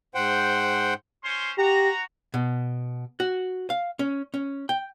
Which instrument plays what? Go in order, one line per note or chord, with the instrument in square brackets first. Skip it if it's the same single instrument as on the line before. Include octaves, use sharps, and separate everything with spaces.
[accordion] G#2 C5 F#5 G5
[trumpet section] C#4 C5 C6
[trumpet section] F#4 A#5 [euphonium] G4
[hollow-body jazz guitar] B2
F#4
F5
C#4
C#4
G5